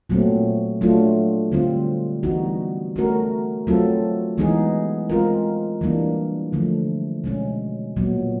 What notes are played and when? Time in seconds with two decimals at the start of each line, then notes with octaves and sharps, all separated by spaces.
0.09 A#2 F#3 A3 C4
0.81 F#3 A3 D4 F4
1.52 D3 G3 C4 F4
2.23 E3 G3 B3 D#4 F#4
2.96 A3 C#4 F#4 A#4
3.67 F#3 A3 C4 F4 A4
4.38 E3 G#3 B3 D#4 G#4
5.10 G#3 C4 F4 A#4
5.81 E3 G3 A#3 D4
6.52 D3 F3 A3
7.24 B2 G#3 C#4
7.96 A#2 F#3 B3